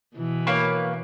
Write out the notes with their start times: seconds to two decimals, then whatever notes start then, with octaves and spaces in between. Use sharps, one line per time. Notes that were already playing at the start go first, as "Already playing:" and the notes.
0.16 B2 E3
0.47 A#3 B4 C#5